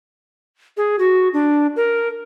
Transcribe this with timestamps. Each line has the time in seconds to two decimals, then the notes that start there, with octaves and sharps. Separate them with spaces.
0.77 G#4
0.99 F#4
1.34 D4
1.76 A#4